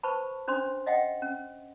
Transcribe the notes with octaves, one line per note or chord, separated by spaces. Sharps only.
B4 C5 A5 B5 C#6
C#4 D4 C5 C6
D#5 E5 F#5 G5
C#4